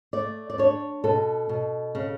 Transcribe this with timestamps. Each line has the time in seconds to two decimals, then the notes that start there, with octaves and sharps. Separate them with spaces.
0.13 A3 D5
0.50 D5
0.58 D4 C#5
1.04 B2 A4
1.49 B2
1.95 C#3